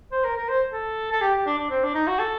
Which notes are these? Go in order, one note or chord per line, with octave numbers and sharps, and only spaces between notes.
C5
A#4
A#4
C5
A4
A4
G4
G4
D4
D4
C4
D4
D#4
F#4
A4